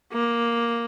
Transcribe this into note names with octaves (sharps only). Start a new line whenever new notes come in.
A#3